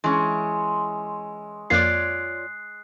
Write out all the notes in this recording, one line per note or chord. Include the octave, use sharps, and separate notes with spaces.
E3 G#3 C#4 C#6
F2 A#3 F4 C#5 D5 F#6 G#6 C7